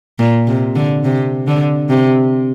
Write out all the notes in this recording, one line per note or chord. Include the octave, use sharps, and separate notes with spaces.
A#2
C3
D3
C3
D3
C3